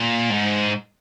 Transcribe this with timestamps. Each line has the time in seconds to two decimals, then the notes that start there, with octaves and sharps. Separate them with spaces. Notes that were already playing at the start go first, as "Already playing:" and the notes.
Already playing: A#2
0.30 G#2